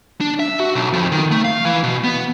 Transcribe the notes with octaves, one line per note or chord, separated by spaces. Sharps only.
D4
E5
F#4
B1
F2
D#3
A3
F5
E3
B2
B3